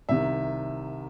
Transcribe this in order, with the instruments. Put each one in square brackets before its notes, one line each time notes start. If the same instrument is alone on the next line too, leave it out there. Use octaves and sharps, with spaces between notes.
[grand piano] C2 C3 D#3 E5